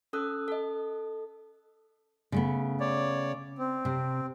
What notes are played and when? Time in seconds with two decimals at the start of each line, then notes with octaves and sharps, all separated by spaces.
0.13 C#4 A4 D#6 E6 F#6
0.48 A4 D#5
2.32 C#3 A3 B3
2.80 C#5 D5
3.59 C4
3.85 C3